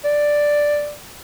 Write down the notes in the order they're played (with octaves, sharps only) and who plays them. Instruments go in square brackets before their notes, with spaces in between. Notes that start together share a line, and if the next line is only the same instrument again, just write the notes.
[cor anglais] D5